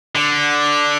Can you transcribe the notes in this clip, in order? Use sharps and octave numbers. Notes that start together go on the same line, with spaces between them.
D3